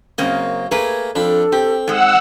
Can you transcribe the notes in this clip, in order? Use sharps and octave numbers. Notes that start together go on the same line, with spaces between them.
F#2 C#3 A#3 C4 D#5
A3 A#3 G#4 A#4 B4
F2 D4 F4 A4 B5
C4 G4
G#2 G#3 F#5 E6